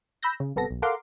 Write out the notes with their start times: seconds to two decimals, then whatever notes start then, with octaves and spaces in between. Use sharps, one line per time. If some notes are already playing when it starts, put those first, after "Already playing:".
0.23 B5 E6 G6 A#6
0.40 C#3
0.56 G1 C3 B3 A4 A#6
0.71 B1
0.82 A4 A#4 F5 F#5 C6 D6